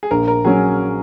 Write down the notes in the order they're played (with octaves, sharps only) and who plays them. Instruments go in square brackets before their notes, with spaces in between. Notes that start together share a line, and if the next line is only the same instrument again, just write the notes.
[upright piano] G#4
[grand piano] A#1 [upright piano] A#4
[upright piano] A#4
[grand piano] F#3 C#4 [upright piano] G#4